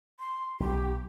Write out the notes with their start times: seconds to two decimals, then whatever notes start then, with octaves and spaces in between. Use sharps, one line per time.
0.20 C6
0.60 B1 G4